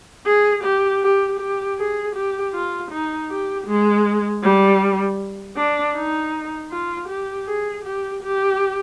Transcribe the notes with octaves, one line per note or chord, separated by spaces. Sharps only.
G#4
G4
G4
G4
G#4
G4
F4
D#4
G4
G#3
G3
D4
D#4
F4
G4
G#4
G4
G4